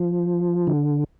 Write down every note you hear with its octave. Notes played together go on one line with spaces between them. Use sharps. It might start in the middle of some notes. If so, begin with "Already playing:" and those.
Already playing: F3
D3